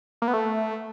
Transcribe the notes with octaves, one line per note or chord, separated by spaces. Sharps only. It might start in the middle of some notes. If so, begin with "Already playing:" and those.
A#3
B3
A3